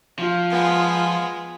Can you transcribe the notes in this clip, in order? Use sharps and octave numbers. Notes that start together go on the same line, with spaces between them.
F3 F4
G#3 B3